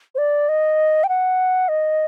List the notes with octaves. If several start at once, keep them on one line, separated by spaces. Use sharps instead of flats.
C5
D5
D#5
G5
F#5
D#5